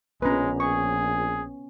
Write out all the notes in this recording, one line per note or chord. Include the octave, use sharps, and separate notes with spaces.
A#1 G#3 B3 C#4 B4 A#5
G#4 C#6